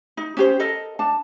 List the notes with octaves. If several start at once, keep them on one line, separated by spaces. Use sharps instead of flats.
D#4
C#4 G4 C5
A4 A#4 D#5
D4 A5